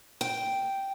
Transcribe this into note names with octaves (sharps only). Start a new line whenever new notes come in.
G5